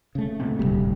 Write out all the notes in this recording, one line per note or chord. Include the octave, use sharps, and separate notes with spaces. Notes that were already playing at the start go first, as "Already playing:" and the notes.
C#3 A3
A#2 C4
D1 G1 C2 G3